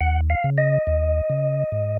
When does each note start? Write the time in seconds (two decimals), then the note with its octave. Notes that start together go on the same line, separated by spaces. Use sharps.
0.01 D#2 F#5
0.30 F5
0.44 C#3
0.58 D#5
0.87 D#2
1.30 C#3
1.72 G#2